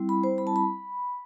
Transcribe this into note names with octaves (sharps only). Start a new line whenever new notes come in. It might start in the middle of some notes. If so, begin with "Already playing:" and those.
Already playing: G3 C4 E4
B5
C5
B5
A5
B5